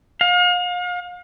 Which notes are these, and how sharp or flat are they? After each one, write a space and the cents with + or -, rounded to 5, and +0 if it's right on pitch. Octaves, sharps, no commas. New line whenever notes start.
F5 +40